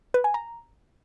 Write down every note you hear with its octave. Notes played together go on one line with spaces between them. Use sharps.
B4
G#5
A#5